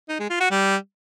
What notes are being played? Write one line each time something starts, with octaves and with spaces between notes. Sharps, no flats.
D#4
G#3
F4
F#4
G3